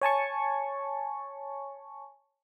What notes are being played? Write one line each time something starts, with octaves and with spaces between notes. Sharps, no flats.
C#5 G#5 A5 C#6